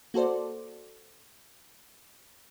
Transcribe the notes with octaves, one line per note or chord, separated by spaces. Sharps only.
A#3 F#4 A4 C5 D5